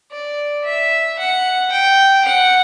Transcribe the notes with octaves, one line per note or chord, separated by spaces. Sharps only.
D5
E5
F#5
G5
F#5